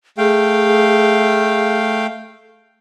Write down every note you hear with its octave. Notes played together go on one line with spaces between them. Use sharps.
A3 G#4 F5 G5